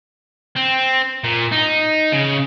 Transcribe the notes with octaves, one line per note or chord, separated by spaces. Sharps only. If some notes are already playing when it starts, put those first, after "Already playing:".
C4
A#2
D#4
C#3